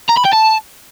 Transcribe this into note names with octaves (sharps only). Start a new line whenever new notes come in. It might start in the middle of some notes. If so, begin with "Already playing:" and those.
A#5
B5
G5
A5